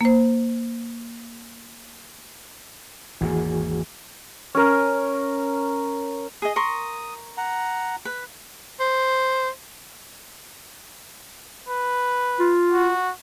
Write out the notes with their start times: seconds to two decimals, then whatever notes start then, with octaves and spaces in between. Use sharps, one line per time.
0.01 A#3 C5
3.21 G#1 E2 E3 A#3 F#4 G#4
4.55 C#4 A#4
6.42 G#4 D#5 D#6
6.56 A#4 C6 C#6
7.37 F#5 A#5
8.05 B4
8.80 C5
11.69 B4
12.39 F4
12.72 F#4